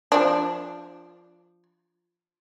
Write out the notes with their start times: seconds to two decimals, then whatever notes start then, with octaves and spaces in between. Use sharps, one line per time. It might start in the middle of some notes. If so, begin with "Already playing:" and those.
0.12 F3 D4